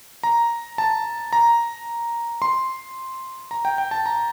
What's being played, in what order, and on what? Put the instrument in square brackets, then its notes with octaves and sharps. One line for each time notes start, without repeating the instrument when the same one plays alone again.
[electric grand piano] A#5
A5
A#5
C6
A#5
G5
G5
A5
A#5